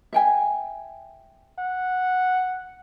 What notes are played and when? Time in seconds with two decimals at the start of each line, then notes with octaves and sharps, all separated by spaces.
0.13 E5 G5 G#5
1.58 F#5